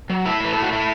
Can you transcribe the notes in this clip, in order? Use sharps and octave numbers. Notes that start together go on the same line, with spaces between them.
F#3
A2 E4
A2 B4
A3 A4
F#4
A3 E4